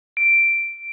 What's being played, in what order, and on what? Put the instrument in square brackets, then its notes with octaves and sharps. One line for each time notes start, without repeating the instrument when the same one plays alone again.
[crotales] D7